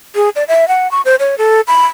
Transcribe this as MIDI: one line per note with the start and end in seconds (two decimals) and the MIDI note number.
0.15 0.29 68
0.36 0.44 74
0.48 0.68 76
0.68 0.90 78
0.91 1.01 85
1.05 1.16 72
1.20 1.38 73
1.38 1.61 69
1.68 1.85 83